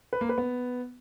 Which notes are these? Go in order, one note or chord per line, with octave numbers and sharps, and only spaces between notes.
B4
A#3
B4
B3